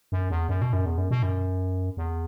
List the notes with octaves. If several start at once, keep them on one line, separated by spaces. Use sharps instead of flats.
F#2
E2
F#2
B2
F#2
E2
F#2
B2
F#2
E2